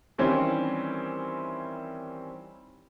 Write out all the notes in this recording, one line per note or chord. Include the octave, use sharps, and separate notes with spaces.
D#3 E3 G3 C4 C#4